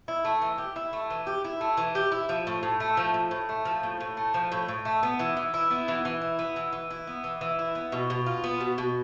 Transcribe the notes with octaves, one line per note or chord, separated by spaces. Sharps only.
E4
A3
E3
G4
E4
A3
E3
G4
E4
A3
E3
G4
E4
F3
A2
A2
A3
F3
A2
A2
A3
F3
A2
A2
A3
F3
A2
A2
A3
B3
E3
E3
E4
B3
E3
E3
E4
B3
E3
E3
E4
B3
E3
E3
E4
B3
B2
B2
F4
B3
B2
B2